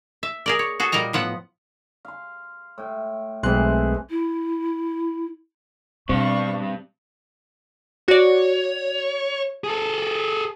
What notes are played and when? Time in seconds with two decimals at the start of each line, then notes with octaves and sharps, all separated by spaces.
0.23 E5
0.46 G#4 A#4 D5
0.59 C#5
0.80 F#4 G#4 A4
0.92 A#2 G3 A#4 D#5 A#5
1.13 A2 F3 B3 F#5
2.05 F5 C6
2.78 A2 G5
3.43 B1 E3 G#3 A3 C4 G#4 C6 F#6
4.10 E4
6.09 G2 B2 C4 D5 F5 C#6
8.08 F#4 C#5 D5
9.64 G#4 A4